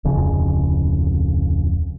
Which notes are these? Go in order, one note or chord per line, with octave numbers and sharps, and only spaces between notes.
D1 F2 C#3